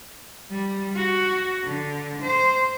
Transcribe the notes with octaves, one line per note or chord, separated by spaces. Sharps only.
G3
F#4
D3
C5